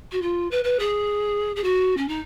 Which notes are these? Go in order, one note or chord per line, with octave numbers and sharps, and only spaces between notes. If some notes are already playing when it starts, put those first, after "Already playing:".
F#4
F4
B4
B4
G#4
G#4
F#4
C#4
D#4